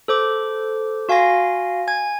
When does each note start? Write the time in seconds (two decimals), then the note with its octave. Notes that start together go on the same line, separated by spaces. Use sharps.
0.08 A4 C5 D6
1.09 F#4 F5 G#5 C6 A#6
1.88 G#5 G#6